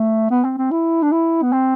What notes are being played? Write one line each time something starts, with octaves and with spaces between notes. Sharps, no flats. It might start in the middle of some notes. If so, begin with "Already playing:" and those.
Already playing: A3
B3
C4
C4
E4
D4
E4
B3
C4